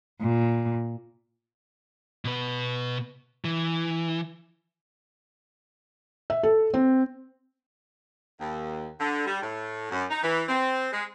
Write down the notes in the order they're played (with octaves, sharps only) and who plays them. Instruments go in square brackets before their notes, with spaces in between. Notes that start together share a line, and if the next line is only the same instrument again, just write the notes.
[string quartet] A#2
[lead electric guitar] B2 B4
E3
[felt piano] E5
A4
C4
[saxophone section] D#2
D3
G3
A2
F#2
D#4
E3
C4
G#3